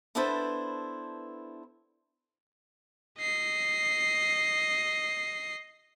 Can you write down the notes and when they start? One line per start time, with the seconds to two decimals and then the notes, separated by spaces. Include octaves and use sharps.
0.15 B3 D4 E4 A4 B4 C5
3.19 D#5 C7